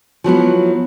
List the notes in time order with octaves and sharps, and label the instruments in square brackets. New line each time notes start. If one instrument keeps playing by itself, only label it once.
[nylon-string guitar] F3 F#3 B3 E4